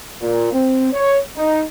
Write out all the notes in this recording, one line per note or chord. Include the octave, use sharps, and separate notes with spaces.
A#2
C4
C#5
D#4